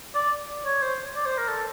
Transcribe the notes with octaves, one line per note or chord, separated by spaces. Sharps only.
D5
C#5
C5
D5
C5
A#4
A4